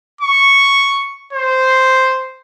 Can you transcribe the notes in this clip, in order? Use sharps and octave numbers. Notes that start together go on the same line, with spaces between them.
C#6
C5